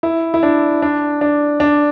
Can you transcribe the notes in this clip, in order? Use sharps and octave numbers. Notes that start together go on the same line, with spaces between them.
E4
E4
D4
D4
D4
D4